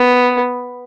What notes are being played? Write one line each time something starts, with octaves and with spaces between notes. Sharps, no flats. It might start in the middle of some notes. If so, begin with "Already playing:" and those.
Already playing: B3